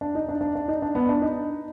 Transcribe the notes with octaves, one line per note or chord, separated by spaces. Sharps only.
D4
D#4
D4
D4
D4
D#4
D4
B3
D4
D#4